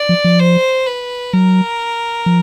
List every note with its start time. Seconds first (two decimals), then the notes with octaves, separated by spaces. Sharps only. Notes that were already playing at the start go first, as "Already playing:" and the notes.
Already playing: D5
0.09 F3
0.24 F3
0.40 C5
0.87 B4
1.33 F#3 A#4
2.26 F3